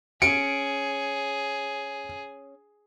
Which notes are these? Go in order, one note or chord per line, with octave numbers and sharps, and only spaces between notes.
C#4 G#4 C#7 D7